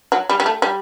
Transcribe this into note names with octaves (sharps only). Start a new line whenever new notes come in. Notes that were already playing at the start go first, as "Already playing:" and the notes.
F#3
G3
G3
A3
G3